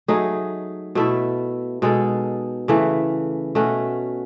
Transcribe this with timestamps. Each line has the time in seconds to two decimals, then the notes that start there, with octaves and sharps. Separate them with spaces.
0.08 F#3 A3 D#4 G#4
0.95 B2 A3 E4 A4
1.82 B2 G#3 D#4 A4
2.68 C#3 E3 A3
3.55 B2 A3 C#4 F#4